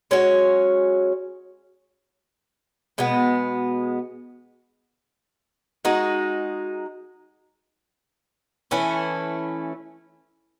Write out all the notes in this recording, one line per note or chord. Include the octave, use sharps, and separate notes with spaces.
G#3 C#4 F#4 C#5
B2 G#3 B3
G#3 D#4 F#4
E3 A3 C#4 E4